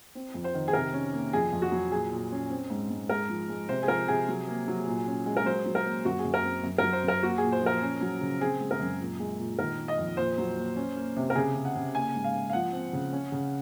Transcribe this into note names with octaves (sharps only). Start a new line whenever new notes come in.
C4
F2
C5
D#3
G#4
C3 A#4
C#4
A#3
F2 G#4
F2
F#4
F#3
A#2 G#4
A#2
C#4
C4
G#2
G#2
G#3 A#4
F3
G#3
C3 C5
G#4
F3 A#4
C3 G#4
F#3
A#3
F#3
A#2
C#4
G#3
A#4
F#3 C5
F#3
A#4
A#3
F#2 F#4
G#4
F#2
A#4
C4
F#2
F#3 A#4
C5
F#2 A#4
A#3 F#4
G#4
A#2
C5
F3 A#4
C#4
F#3
C#3
C4 G#4
G#3
A#4
F#2
A#2
G#3
A#2
D#3 A#4
A#3
D#5
F2
A#2 C5
F#3
A#3
C#4
A#3
C3
A#4
C#3 G#4
C#3
F#5
C#3
A#3 G#5
G#2
F5
A#3
F5
F3 F#5
C4
C#3
C#4
C#3